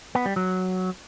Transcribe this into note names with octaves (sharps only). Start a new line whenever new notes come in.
B3
G3
F#3